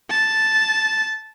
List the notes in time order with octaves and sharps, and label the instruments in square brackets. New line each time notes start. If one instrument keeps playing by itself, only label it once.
[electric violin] A5